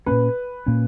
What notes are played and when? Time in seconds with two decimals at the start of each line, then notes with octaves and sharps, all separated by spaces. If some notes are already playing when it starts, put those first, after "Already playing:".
0.06 A#2 A#3 C#4 B4
0.66 A#2 A#3 C#4